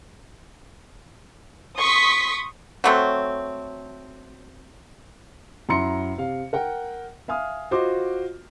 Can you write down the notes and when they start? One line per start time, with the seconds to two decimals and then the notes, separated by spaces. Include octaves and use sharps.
1.77 C6 C#6 D#6 B6
2.84 F#3 A3 C4
5.69 F#2 E4 E5 A#5 C6 C#7
6.18 C3 F5
6.53 A#4 F#5 G5
7.28 E5 F5 G#5 D#6 F6
7.71 F4 F#4 C5 D#5 D6